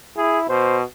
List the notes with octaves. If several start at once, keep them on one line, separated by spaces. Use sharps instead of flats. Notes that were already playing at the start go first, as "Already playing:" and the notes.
E4 G#4
B2 C5